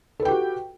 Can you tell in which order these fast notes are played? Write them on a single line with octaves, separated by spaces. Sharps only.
A4 B4 G5 G4 F#4